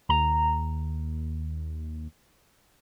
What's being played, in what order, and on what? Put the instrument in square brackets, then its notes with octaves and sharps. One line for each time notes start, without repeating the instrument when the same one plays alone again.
[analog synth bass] D#2 [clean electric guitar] A#5